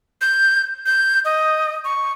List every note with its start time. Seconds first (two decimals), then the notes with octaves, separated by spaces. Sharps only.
0.21 G6
0.86 G6
1.25 D#5
1.85 C#6